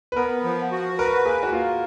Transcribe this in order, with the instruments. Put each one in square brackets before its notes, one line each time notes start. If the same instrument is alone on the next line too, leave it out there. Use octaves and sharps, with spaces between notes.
[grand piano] B4
[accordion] B3 [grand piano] A#4
[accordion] F3
F#4
[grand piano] A#4 [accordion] B4
[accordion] A#3 [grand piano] G#4
[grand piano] F#4
[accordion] A#3 [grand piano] F4